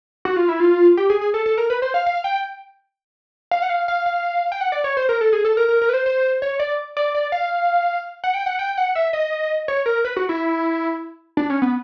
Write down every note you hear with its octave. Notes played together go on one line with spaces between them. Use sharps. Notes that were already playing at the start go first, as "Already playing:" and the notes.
F#4
F4
E4
F4
G4
G#4
G#4
A4
A4
A#4
B4
C5
F5
F5
G5
F5
F#5
F5
F5
F5
G5
F#5
D5
C#5
C5
A#4
A4
G#4
A4
A#4
A#4
A#4
B4
C5
C5
C#5
D5
D5
D5
F5
F#5
G5
F#5
G5
F#5
E5
D#5
C#5
A#4
B4
F#4
E4
D4
C#4
B3